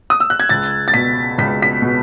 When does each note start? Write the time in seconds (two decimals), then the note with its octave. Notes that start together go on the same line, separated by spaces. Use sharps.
0.10 D#6
0.20 E6
0.30 F#6
0.40 G#6
0.49 C#2 A6
0.88 A6
0.94 B2 B6
1.38 C#2 B6
1.62 B6
1.82 B2